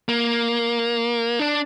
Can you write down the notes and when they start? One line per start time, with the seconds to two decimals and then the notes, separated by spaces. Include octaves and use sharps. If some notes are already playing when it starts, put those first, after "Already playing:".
0.09 A#3
1.39 D4